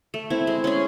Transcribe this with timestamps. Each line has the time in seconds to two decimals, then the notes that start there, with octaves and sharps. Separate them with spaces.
0.14 A3
0.30 C4 E4
0.47 G#3
0.64 C#4 G#4